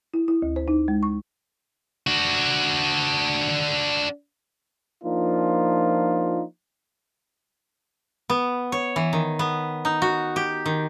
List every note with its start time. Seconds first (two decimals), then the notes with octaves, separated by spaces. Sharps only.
0.14 E4
0.28 E4
0.42 D2
0.56 C5
0.68 D#4
0.88 G#3
1.03 C#6
2.07 D4 F#4
5.04 F3 A#3 D4 D#4 F4
8.30 B3
8.72 C#5
8.96 E3
9.13 D#3
9.39 B3
9.85 D#4
10.02 F#4
10.36 G4
10.66 D#3